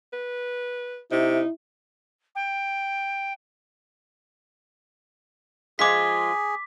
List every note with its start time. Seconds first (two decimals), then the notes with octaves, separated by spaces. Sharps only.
0.13 B4
1.12 C3 D#4 E4
2.35 G5
5.79 F3 G#3 F4 G#4 D6 B6